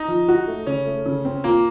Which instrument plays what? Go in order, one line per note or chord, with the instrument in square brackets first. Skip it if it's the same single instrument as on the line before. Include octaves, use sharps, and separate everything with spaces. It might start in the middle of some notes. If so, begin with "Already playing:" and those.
Already playing: [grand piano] D#4
[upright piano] F3
F#4
A3
[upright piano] C#3 [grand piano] C#4
[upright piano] A3
C#3
C4
[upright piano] A#2 [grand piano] A#3